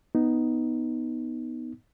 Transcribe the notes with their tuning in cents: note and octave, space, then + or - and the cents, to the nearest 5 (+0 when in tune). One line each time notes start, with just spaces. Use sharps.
B3 +0 D#4 +0